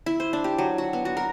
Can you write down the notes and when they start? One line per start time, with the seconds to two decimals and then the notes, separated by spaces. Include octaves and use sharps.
0.06 E4
0.20 C5
0.33 D4
0.44 G4
0.58 F#3
0.78 F#4
0.93 B3
1.05 F#4
1.17 A#4